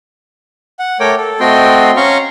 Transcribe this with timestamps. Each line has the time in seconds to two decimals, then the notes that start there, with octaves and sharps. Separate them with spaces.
0.79 F#5
1.00 A3 A#4 C#5 G5 D6
1.17 A4
1.40 A3 C4 F#4 D#5 G5 C6
1.96 C#4 F5 A#5 C6 C#6